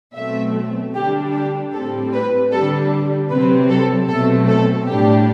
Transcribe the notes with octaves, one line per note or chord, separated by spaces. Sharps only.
B2 F#3 A3 C4 E5
D3 G3 D4 G4
G4
A2 G3 C4 A4
B4
D3 G3 D4 A4
C3 F#3 C4 B4
A4
B2 F#3 A3 C4 A4
A4
A2 G3 D4 G4